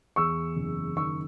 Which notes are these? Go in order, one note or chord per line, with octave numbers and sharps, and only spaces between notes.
E2 C#6 E6
F#1
D#3 C#6 E6